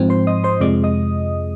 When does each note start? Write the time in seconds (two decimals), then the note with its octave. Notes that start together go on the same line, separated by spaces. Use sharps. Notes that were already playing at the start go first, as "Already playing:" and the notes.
Already playing: G#2 F3 C4
0.10 C5 C6
0.27 D#5 D#6
0.44 C5 C6
0.61 F2 C3 F3 G#3 D5 D6
0.84 D#5 D#6